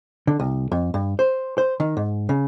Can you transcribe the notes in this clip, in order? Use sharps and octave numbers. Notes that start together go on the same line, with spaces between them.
D3
C2
F2
G2
C5
C5
D#3
G#2
C#3